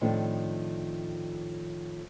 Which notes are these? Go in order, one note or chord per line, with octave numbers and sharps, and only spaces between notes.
A2 D#3 F3 C4 D4 A4